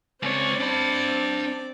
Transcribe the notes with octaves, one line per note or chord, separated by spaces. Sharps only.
C#2 C4 C#5 D5
D4 B5